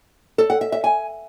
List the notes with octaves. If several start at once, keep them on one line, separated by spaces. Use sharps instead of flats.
A4
F#5
E5
E5
G#5